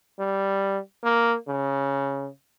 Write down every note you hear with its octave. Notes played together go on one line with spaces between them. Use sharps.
G3
A#3
C#3